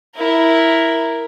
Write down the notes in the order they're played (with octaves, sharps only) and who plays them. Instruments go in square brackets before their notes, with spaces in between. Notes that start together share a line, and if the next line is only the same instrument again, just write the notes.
[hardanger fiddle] E4 A#4